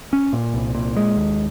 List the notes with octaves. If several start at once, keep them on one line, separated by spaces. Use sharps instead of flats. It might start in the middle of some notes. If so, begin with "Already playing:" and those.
C#4
A#2
C2
A#2
G#3
D#2